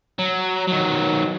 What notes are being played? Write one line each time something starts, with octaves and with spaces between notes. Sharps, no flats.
F#3
D#3 F#3